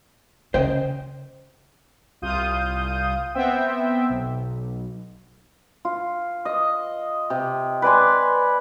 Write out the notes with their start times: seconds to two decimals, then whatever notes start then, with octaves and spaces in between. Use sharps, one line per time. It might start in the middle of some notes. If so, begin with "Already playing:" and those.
0.54 C#3 C5 D#5 G5
2.22 C2 F4 F5 D#6 G6 D#7
3.35 B3 C4 C5 E5 G5
4.10 B1
5.85 F4
6.45 D#5
7.30 C3
7.82 B4 D5 G#5 C6